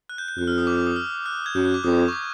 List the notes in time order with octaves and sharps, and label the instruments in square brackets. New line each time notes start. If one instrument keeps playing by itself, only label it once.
[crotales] F#6
G6
G6
[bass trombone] F2 [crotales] F#6
[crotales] F6
D#6
D6
D6
D#6
F6
F#6
G#6
[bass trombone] F#2 [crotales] G6
[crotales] F#6
D6
[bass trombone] F2 [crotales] D#6
[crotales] C#6
D6